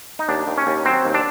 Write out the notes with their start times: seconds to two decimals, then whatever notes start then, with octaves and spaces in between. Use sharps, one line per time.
0.19 D#4
0.28 D#2 D4
0.48 D#2
0.57 C#4
0.67 D#2
0.85 F#3 C4
1.05 D#2
1.14 D4